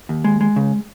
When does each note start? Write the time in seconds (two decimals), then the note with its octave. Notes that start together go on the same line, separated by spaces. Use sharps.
0.09 D#2
0.24 G#3
0.41 G#3
0.56 C#3